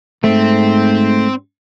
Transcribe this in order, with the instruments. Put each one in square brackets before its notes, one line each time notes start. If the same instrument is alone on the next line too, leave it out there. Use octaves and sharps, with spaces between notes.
[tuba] G#2 [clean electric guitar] A3 [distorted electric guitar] C4